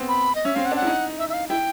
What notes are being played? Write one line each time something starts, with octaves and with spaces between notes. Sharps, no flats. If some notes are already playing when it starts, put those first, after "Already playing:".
Already playing: B3 C4
B5
D#5
C#4 E5
C4 F5
F#5
D4
F#5
E4
D#4
E5
E5
F5
E4 G5